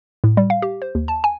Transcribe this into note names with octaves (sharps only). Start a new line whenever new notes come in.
A2
G3
F5
G4
C5
D#2
A5
G#5